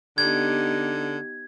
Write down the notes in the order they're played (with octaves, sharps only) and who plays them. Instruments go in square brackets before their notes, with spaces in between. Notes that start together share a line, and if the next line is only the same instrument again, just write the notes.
[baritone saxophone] D3 [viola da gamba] B3 D#4 G4 [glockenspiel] G#6